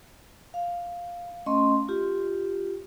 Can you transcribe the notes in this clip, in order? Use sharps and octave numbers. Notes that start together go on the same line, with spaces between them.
F5
A3 C#4 D#5 C6
F4 G4